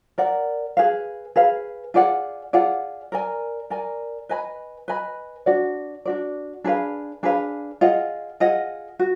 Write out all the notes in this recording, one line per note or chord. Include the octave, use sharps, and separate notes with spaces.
A#4 D5 F#5
G#4 B4 F5
G#4 B4 F5
F4 G#4 D5 F#5
F4 G#4 D5 F#5
A#4 D5 G#5
A#4 D5 G#5
B4 D#5 G#5 B5
B4 D#5 G#5 B5
D4 F#4 D5
D4 F#4 D5
D4 G#4 B4 F5
D4 G#4 B4 F5
F4 G#4 D#5 F#5
F4 G#4 D#5 F#5
F#4